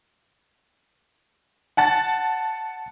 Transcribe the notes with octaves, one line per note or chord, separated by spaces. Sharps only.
F#5 A5 A6